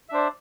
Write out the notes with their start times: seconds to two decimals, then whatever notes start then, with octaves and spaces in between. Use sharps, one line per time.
0.09 E5
0.12 D4
0.14 C5
0.17 D5